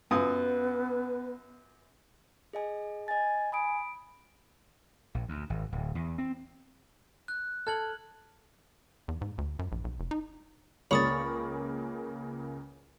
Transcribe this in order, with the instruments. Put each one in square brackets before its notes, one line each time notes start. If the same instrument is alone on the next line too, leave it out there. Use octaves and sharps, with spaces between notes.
[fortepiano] F#2 F4 D#6 [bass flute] B3 [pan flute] B4
[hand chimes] G#4 D#5 G#5
[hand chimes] D#5 A6 [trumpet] G#5
[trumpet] G#5 [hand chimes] B5 D#6 D7
[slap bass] A#1
D2
G#1
D1
E2
C4
[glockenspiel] F#6
[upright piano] A4 [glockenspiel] F6 G#6 F#7
[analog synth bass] E2
G#2
D2
F#2
A#1
B1
F1
D#4
[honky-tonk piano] C#2 C#3 A#3 [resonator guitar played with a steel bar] C#5 [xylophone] B5 D#6 A6